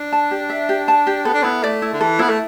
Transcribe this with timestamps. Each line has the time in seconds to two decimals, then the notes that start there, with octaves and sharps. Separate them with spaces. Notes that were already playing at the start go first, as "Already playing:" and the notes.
Already playing: D4
0.12 A5
0.31 G4
0.50 E5
0.69 G4
0.88 A5
1.07 G4
1.25 B3 A4
1.34 D4
1.42 B3 E4
1.63 A3 D5
1.82 E4
1.93 D3
2.01 E3 A4
2.19 B3 E4
2.29 A3